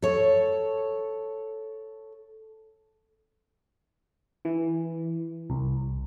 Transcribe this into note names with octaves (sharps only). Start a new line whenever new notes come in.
A4 C#5
E3
C2